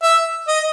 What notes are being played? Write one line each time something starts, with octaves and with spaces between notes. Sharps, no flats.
E5
D#5